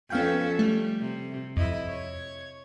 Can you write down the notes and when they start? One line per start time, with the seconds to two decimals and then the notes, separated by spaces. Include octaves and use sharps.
0.10 F2 B3 C#4 A4 F5 G5
0.59 G3 A3
1.01 C3
1.57 F2 E4 D#5
1.88 C#5